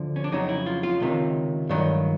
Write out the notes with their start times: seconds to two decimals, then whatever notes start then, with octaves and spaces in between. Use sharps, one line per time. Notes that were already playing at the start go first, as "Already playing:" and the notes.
Already playing: D2 D3 F3
0.16 C#4
0.24 D4
0.32 F2 C#3 F#3 D#4
0.49 E4
0.66 F4
0.83 F4
1.00 C#2 C3 D#3
1.69 G2 D#3 F#3